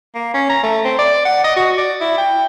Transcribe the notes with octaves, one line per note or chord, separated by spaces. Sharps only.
A#3
C#4
A#5
A3
C4
D5
F#5
D#5
F#4
D5
E4
G5